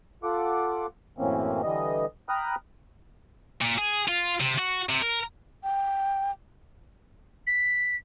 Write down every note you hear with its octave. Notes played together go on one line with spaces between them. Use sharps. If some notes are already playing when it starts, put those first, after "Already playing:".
F4 A4 F#5 D6
F#2 A2 E3 A#3 C4 C#4
D3 E3 G3 D#5
G5 A#5 B5 D#6 F6 F#6
A#2
G#4
F4
C3
F#4
C3
A#4
G5
B6